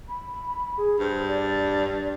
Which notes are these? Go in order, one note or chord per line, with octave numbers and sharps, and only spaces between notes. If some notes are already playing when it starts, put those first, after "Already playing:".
B5
G#4
G2 C5
D5